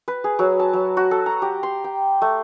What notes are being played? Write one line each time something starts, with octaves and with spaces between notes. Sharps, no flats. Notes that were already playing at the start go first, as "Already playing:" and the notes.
B4
G#4
F#3
A5
F#3
F#4
A4
A#5
G4
C6
G5
A3